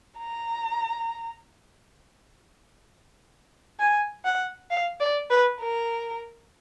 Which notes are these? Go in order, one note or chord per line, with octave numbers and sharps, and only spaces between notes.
A#5
G#5
F#5
F5
D5
B4
A#4